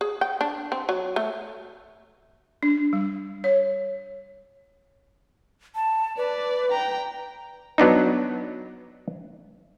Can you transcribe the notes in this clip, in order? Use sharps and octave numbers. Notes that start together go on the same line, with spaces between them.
G#4
G5
D4
C4
F#3
A3
D4
G3
C#5
A5
B4 D5
G5 A#5
F#3 B3 D4 D#4